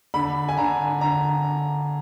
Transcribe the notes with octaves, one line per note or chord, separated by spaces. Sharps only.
D3 B5
G#5
D3 A#5
D3 A#5